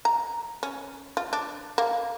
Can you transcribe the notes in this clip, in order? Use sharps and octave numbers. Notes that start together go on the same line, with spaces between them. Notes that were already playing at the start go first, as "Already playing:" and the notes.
A#5
C#4
F4
D4
A#3